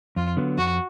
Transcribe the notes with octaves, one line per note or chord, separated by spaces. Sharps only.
F2 F4
D3 F#3 B3
F2 F#4